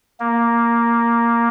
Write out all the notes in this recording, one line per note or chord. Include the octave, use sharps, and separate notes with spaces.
A#3